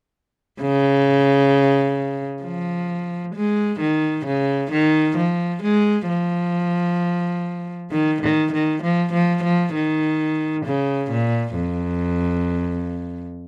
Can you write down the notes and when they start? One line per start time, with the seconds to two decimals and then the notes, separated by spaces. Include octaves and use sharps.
0.61 C#3
2.43 F3
3.35 G#3
3.80 D#3
4.26 C#3
4.72 D#3
5.17 F3
5.63 G#3
6.09 F3
7.91 D#3
8.22 D#3
8.53 D#3
8.83 F3
9.13 F3
9.44 F3
9.74 D#3
10.66 C#3
11.11 A#2
11.57 F2